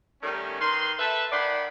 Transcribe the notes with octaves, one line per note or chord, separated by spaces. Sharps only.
D#3 G3 A3 C#4
D#3 B4 C6
A4 B4 E5
D#3 D5 F#5 B5 C6